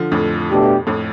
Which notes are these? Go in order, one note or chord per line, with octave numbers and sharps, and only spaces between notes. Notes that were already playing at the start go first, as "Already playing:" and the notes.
Already playing: D3 F3
F2 A2
B2 A3 D4 G4
F2 A2